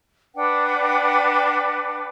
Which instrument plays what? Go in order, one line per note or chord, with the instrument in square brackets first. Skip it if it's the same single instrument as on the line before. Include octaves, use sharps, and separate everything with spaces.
[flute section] D4 B4 F#5 G5